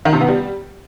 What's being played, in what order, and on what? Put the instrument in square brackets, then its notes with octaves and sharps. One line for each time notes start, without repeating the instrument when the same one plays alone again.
[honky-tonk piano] D#3
C3
B3
G3